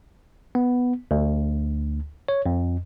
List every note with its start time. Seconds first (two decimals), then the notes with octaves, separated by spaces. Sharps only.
0.55 B3
1.11 D2
2.28 C#5
2.46 F2